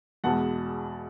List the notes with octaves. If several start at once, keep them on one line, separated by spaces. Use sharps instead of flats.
E2 B2 G#3 F#5 A5